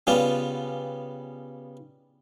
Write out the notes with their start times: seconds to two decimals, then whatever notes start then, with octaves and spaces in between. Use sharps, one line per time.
0.07 C#3 G3 B3 F4